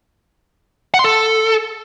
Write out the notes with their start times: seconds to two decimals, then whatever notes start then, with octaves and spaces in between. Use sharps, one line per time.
0.94 F#5
0.99 C6
1.04 A4